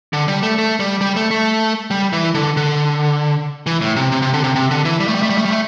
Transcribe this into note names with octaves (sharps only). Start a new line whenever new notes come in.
D3
G3
A3
A3
G3
G3
A3
A3
G3
E3
D3
D3
E3
A2
C3
C3
C3
D3
C3
C3
D3
E3
G3
A3
G3
A3
G3
A3
G3
A3